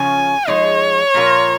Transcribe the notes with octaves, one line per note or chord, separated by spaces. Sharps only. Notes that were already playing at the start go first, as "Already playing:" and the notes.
Already playing: C#3 F3 C#4 F4 C#5 G#5
F3 G#3 D#4 G#4 C#5
A#2 F3 A#3 F4 A#4